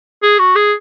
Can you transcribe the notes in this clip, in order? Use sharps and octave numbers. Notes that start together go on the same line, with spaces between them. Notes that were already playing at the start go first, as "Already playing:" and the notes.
G#4
F#4
G#4